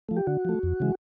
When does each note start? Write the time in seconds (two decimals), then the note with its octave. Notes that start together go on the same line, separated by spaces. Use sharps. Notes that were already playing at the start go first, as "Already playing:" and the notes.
0.09 F3 A3
0.17 G4
0.27 D3 F#4
0.45 F3 A3
0.63 F2
0.80 C#3 E3 G#3